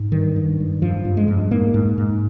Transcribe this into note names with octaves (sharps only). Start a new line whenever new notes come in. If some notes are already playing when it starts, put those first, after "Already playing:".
Already playing: G#2
G2 D#3
G2
G2
G2 F3
G2
G#3
G2
G#2 A#3
G#2
G#2